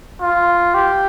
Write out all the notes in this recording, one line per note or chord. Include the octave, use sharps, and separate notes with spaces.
F4
G4